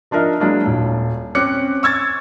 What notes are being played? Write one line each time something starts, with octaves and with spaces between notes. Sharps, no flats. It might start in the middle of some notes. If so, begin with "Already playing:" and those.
F3 D4 D#4 A#4 E5
F#3 G#3 A#3 D4 E4
D#1
C4 C#4 D6 F#6 C#7
C#6 E6 G#6 A6